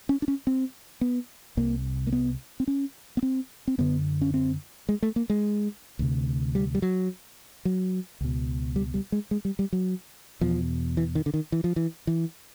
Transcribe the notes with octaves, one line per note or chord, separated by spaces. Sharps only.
C#4
D4
C#4
C4
B3
C2 C3 A#3
A#3
B3
C4
C#4
B3
C4
C4
F#2 D3 B3
C#4
C4
G#3
A3
A#3
G#3
D2 C3
G3
G3
F#3
F#3
C#2 B2
G3
G3
G#3
G#3
G3
G3
F#3
E2 B2 F3
E3
D#3
D3
D#3
E3
F3
E3
E3